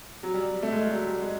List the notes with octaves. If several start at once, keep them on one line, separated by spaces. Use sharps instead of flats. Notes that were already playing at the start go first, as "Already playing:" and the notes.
F#3
G3
A3
G#3
G3
F#3
G3
G#3